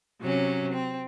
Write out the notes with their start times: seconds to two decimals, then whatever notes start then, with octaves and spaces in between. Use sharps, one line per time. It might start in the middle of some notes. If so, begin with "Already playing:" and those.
0.21 C3 F#3 C#4
0.73 C4